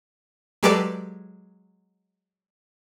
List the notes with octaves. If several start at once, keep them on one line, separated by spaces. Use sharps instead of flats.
F#3 G#3 G4 A4 B4 D5